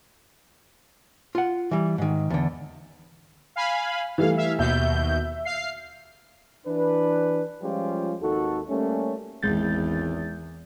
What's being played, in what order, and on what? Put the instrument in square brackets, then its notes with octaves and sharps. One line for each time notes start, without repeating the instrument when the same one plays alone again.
[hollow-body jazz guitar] F4 F#5
E3 G3
G#2 D#3
E2 D3
[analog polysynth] F5 G#5 B5
[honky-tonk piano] E3 G3 A3 [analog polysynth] F5
[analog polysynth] E5 F5
[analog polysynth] D#2 B2 G6 [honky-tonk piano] E5
[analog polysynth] F5 C7
[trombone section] E3 D4 B4
F3 G3 G#3 C#4 F4 G4
G#1 D#2 D#4 F#4 A4
G3 A3 A#3 C#4
[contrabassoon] G#1 [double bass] E2 [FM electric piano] G#3 G6 A6